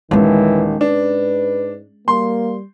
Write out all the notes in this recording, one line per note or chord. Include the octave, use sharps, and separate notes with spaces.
D#1 D#3 E3 G#3 C#4
G#2 D4 B4
G3 A#3 C6